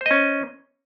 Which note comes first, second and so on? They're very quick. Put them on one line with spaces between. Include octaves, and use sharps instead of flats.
C5 D#5 C#4